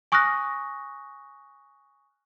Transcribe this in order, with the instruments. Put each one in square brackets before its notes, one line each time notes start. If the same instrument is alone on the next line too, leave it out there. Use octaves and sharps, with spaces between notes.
[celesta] G#5 C#6 D#6 F6 F#6 A#6